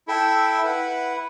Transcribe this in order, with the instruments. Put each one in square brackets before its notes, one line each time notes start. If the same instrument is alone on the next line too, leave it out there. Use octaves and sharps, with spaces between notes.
[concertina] E4 A4 E5 G5
E4 B4 F#5